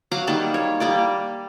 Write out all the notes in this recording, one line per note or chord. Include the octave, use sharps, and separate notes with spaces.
F#3 F5 F#5 D6
D#3 G3 A#3 A5
C#5
G3 A#3 D5